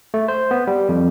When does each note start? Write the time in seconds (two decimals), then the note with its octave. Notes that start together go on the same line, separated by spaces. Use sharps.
0.14 A3
0.28 C5
0.51 B3
0.67 G3
0.89 F2